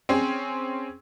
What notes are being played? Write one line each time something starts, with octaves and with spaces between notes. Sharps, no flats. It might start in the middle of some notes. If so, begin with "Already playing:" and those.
C4 C#4 G#4